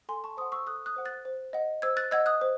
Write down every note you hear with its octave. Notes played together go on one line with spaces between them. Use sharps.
A4 G#5 C6
A5 C#6
C5 F#5 C6 D#6
C#6 E6
A4 D#6 F#6
D#6 F#6
C5 F#5
F#6 A6
C5
D#5 F#5
C5 E6 G#6
F#6 A6
D#5 F#5 E6 G#6
D#6 F#6
C5